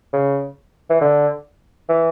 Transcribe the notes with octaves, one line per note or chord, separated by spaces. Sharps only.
C#3
E3
D3
E3